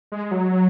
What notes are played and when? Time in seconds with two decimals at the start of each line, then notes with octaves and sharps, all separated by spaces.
0.12 G#3
0.31 F#3